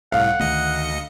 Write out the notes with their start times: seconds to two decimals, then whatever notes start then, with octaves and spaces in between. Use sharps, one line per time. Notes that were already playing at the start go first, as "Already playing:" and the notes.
0.12 C2 A2 F5 F#5
0.40 D2 D#3 A3 D#5 C#7